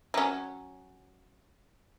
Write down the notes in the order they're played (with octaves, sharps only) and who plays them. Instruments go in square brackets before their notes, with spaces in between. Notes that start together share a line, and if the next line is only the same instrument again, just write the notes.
[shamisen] F#3 C#4